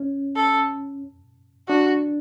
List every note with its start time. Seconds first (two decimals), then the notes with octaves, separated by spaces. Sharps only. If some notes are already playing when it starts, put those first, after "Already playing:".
Already playing: C#4
0.36 A4
1.68 D4 F#4